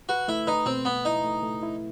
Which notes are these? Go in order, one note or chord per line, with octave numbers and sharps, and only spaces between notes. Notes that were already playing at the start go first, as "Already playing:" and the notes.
F#4 B4
A3 E4
D#4 B4
B2 C4
B3 B4
D#4 E4
A3
A3
E4